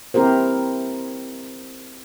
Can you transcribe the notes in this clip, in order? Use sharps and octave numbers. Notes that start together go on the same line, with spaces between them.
C4 E4 G4 A#4 C5